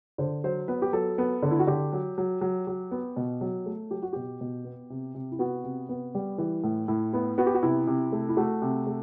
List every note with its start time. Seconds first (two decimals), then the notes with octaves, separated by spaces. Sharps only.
0.18 D3 C5
0.44 F#3 C5
0.68 B3 B4
0.82 G4
0.93 F#3 A4
1.18 B3
1.43 D3
1.51 E4
1.59 F#4
1.67 D3 G4
1.93 F#3
2.18 F#3
2.41 F#3
2.67 F#3
2.91 B3
3.17 B2
3.41 F#3
3.66 A3
3.91 F#3 G4
4.02 F#4
4.13 B2 G4
4.41 B2
4.65 B3
4.90 C3
5.15 C3
5.32 E4
5.39 B3 F#4
5.64 C3
5.89 B3
6.15 G3
6.38 E3
6.64 A2
6.88 A2 E4
7.13 B3 E4
7.38 B3 F#4
7.46 G4
7.54 F#4
7.62 C3 E4
7.87 C3
8.12 A3
8.29 E4
8.37 A3 F#4
8.62 C3
8.87 A3